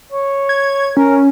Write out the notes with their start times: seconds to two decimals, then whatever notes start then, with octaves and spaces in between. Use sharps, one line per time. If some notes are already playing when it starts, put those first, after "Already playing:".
0.12 C#5
0.49 G#6
0.97 C#4 A#4